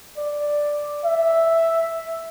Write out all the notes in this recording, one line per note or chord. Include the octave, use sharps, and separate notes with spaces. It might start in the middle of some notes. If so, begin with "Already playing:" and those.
D5
E5